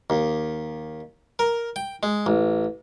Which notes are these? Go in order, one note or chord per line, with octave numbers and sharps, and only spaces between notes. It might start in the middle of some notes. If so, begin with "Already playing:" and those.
D#2
A#4
G5
G#3
A1